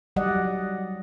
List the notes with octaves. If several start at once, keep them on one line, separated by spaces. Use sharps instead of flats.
F#3 G3 D5 D#5 F#5